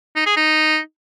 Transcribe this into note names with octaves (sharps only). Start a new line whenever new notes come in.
D#4
G#4
D#4